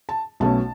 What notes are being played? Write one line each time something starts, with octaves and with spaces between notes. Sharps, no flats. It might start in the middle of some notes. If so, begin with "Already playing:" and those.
A5
B1 B2 A3 C#4 A5